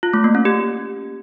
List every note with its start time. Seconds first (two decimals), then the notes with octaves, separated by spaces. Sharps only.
0.03 F4
0.14 A3
0.24 A#3
0.35 C#4
0.45 G4